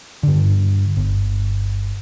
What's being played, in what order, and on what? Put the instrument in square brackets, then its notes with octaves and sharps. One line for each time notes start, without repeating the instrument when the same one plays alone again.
[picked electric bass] G2 D3
G1